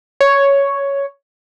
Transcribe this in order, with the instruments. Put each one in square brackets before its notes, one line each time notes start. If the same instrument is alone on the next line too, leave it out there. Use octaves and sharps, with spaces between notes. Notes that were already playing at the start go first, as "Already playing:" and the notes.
[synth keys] C#5